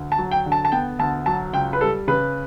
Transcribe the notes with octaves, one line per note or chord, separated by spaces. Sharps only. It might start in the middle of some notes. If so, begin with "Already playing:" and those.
Already playing: D2
A5
F#3
G5
D3
A5
A5
B3 G5
D2 A5
F#3 A5
C#2 G5
B4
G3 A4
C#3 B4